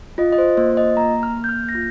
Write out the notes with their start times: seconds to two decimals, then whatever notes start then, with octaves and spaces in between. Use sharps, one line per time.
0.18 F4 D#5
0.32 D#5
0.38 C5
0.57 A#3 C5
0.77 D#5
0.97 A#3 A#5
1.23 F6
1.36 A#3
1.44 G6
1.49 F6
1.69 A#6
1.75 F4 G6